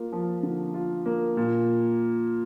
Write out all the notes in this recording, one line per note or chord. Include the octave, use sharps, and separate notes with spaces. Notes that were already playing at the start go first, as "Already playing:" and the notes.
Already playing: A#3 F4
F3
D3
F4
A#3
A#2